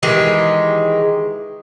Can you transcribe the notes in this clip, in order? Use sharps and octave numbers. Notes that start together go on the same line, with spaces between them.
D#3 E3 G#3 G4